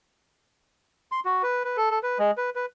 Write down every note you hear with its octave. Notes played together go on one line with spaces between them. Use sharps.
C6
F#4
B4
B4
A4
A4
B4
G#3
B4
B4